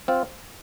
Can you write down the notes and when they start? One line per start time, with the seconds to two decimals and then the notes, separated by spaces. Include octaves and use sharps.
0.08 C4 F4